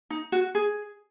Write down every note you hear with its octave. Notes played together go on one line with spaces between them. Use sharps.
D#4
F#4
G#4